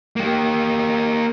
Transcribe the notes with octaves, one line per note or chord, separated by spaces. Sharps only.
A#3 G4